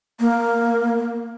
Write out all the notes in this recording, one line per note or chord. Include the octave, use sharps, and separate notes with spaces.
A#3